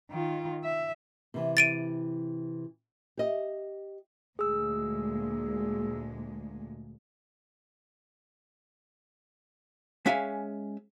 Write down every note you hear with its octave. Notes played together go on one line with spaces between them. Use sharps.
D#3 F4
E5
C3 E3
A6 D7 D#7
G4 D#5
D2 A#2 G#3 G#4 E6
G#3 C#4 E5 F5 G#5